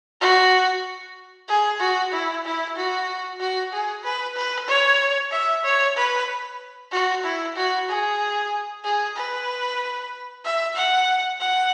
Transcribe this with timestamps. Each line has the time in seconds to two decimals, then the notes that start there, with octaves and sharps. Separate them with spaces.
0.21 F#4
1.49 G#4
1.80 F#4
2.12 E4
2.45 E4
2.77 F#4
3.40 F#4
3.73 G#4
4.04 B4
4.36 B4
4.68 C#5
5.32 E5
5.64 C#5
5.97 B4
6.92 F#4
7.24 E4
7.56 F#4
7.89 G#4
8.84 G#4
9.16 B4
10.45 E5
10.76 F#5
11.41 F#5